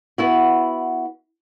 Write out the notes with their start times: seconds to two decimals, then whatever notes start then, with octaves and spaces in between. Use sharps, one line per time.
0.18 B3 E4 F#4